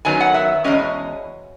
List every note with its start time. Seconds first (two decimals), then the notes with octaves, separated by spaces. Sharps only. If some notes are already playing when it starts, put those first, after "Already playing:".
0.05 F#2 D#3 F#3 B3 G#5
0.20 F#5
0.34 E5
0.64 E2 B2 G#3 C#4 D#5